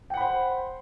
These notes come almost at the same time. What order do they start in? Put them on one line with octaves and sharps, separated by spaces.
G5 F#5 B5 C5